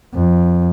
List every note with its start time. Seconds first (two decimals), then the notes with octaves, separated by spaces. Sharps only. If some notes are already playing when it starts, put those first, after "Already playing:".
0.14 F2